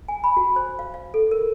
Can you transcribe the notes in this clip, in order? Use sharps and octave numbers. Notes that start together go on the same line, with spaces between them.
G#5
B5
F#4
C5
F5
F5
A4
A#4